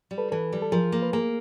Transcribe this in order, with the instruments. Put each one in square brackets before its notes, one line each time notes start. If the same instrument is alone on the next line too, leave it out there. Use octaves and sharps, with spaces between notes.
[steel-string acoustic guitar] G3
[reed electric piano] A4 B4
[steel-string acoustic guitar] E3 [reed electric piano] A4 B4
[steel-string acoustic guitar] G3
[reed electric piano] A4
[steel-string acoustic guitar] F3 [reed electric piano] G#4 A#4
[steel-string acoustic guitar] A#3
[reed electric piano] B4
[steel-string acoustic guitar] A#3 [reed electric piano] G#4 A#4